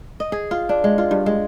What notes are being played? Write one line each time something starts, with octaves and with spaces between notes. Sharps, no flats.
D#5
G#4
F4
D4
G#3
F4
G2
G#3